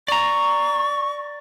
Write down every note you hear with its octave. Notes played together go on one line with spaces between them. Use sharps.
D5 A#5 C#6